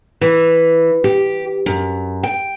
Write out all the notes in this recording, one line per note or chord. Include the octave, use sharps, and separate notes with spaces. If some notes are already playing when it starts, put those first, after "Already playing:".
E3
G4
F#2
G5